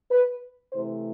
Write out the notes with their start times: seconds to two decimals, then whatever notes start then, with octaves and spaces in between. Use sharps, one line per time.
0.10 B4
0.71 C3 E3 A3 C5